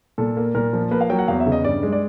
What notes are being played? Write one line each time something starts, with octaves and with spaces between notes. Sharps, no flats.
A#2 A4
A#3
A#2 A#4
F3
A#3 B4
F5
F#3 G5
F#5
E2 F5
E5
C#3
D#5
G2 D5
G#3
D5